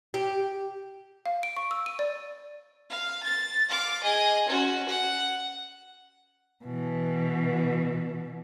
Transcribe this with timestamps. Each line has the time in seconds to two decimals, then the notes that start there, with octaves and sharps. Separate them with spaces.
0.14 G4
1.26 F5
1.43 D7
1.57 C#6
1.71 E6
1.86 D#7
1.99 D5
2.90 F5
3.23 A6
3.68 F5 D6
4.03 G#4 D#5
4.48 C#4 F#4
4.88 F#5
6.65 B2 E3